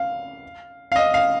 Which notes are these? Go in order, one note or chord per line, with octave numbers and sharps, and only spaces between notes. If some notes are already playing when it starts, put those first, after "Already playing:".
Already playing: F5
F5
D#5
F5